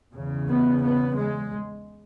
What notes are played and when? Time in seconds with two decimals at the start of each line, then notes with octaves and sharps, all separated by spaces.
0.13 E2 C#3
0.48 B3
0.82 B3
1.17 G#3